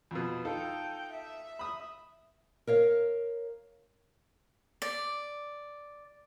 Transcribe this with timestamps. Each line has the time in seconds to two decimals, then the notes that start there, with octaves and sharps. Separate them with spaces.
0.11 F2 B2
0.45 D#4 F4 A4 G5
1.12 E5
1.59 B5 D#6
2.67 A#4 C#5 F5
4.82 D5